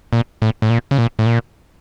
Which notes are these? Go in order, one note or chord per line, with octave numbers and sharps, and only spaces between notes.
A#2
A2
A2
A#2
C#3
A#2
A2
A#2